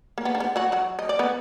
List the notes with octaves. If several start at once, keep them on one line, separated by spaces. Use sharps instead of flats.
A#3
B3
D4
B3
F#3 F#4
F#3 F#4
D#5
D5
B3 B4